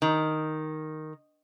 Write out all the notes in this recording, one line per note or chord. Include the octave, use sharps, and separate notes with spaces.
D#3